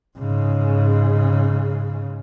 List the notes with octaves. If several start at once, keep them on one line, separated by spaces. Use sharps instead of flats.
G#2 C#3